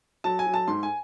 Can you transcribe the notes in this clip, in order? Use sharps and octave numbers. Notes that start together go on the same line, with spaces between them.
F#3 A5
G#5
F#3
A5
G#2 C6
G#5